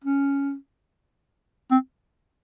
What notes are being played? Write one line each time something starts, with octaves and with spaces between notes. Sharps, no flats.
C#4
C4